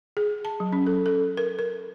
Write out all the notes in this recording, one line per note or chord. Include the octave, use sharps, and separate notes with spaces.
G#4
A5
F#3
C#4
A4
A4
A#4
A#4